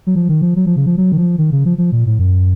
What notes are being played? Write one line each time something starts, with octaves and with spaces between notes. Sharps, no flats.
F#3
F3
D#3
F3
F#3
F3
C#3
F3
F#3
D#3
F3
D#3
C#3
F3
F3
A#2
A2
F#2